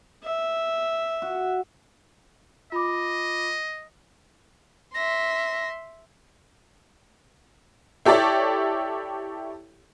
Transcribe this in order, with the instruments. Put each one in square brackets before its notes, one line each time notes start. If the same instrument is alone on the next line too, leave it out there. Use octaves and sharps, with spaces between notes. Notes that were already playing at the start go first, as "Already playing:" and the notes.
[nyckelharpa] E5
[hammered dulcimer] F#4
[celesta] F4 B5 D6 [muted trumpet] D#5
[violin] E5 C6 [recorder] A#6
[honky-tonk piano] E4 G4 A4 C#5 D5 E5